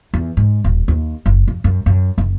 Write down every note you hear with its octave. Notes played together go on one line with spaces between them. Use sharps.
E2
G#2
D#1
D#2
F#1
F2
F#2
F#2
F#1